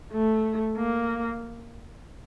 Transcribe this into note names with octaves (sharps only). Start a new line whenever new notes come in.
A3
A#3